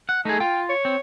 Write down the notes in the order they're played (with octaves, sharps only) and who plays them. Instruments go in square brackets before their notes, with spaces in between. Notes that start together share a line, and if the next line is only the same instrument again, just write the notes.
[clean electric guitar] F#5
[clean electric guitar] A3 G#4 [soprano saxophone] D#4
[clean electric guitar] F4 [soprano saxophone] G5
[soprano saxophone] C#5
[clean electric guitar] C4